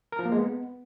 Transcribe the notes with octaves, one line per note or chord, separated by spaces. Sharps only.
A#4
F3
A#3
G#3
B3